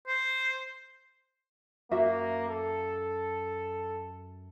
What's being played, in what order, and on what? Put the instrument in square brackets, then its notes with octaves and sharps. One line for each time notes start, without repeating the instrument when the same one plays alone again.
[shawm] C5
[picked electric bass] F#2 [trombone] A#3 [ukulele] F#4 E5
[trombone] A4